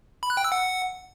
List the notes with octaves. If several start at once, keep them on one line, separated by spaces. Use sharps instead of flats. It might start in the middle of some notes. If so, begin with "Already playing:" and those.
B5
F#6
G5
E6
F#5